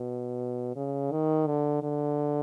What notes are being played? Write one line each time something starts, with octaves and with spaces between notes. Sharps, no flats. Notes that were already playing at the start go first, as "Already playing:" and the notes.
Already playing: B2
C#3
D#3
D3
D3